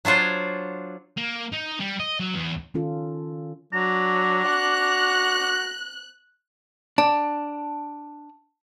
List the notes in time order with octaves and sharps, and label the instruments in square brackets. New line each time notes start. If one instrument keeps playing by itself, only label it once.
[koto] F#3 D4 F4 C5 C#5
[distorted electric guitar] A#3
D#4
G3
D#5
F#3
E2
[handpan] D#3 C#4 F4 A4
[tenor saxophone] F#3 [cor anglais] D4 [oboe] A#5
[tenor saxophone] F#4 [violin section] F#6
[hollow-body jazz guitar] D4 [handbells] A5